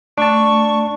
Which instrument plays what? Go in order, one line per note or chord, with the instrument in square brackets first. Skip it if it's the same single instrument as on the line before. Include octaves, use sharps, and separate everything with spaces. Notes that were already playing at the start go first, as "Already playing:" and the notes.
[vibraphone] A3 [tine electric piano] D4 A5 [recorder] C#6